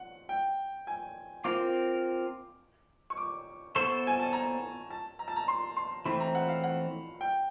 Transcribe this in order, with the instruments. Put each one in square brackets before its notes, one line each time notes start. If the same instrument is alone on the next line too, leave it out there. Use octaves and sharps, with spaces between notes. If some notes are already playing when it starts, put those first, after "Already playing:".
Already playing: [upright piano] F#5
G5
G#5
[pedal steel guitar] C4 F4 A#4 [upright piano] D6
[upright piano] C#6
D6
[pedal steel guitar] B3 E4 A4 C5 [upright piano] C#6
[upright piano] G#5
A5
A#5
A5
A#5
A5
A#5
C6
C6
[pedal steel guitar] E3 A3 C4 [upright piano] B5
[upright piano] A#5
F#5
F5
F#5
G5